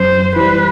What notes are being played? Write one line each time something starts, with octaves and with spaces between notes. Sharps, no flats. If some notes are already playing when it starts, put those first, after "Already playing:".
Already playing: F#2 C5
E3 G3 B4